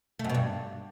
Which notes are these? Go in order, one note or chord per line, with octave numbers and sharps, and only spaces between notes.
A3
F#2
B2
G2